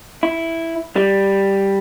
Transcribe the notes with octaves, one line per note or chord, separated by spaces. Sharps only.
E4
G3